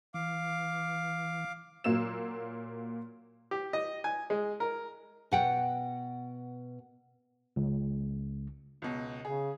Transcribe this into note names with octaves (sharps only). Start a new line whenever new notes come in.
E3 F5 D6
A#2 F#3 A#3 E6 E7
G4
D#5
G#5
G#3
A#4
B2 F#5 G5
C#2
C#2 B2
C#3 G#4